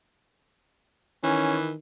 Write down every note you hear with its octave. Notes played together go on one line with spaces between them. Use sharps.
D#3 E3 C#4